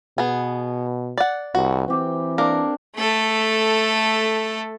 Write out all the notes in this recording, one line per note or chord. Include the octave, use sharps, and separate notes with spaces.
B2 B3 G#4
D5 F#5
C2 F#4
E3 C4 G4
A#3 D4 A#4
A3 A4